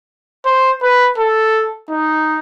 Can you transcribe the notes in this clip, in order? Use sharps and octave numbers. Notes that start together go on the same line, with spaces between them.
C5
B4
A4
D#4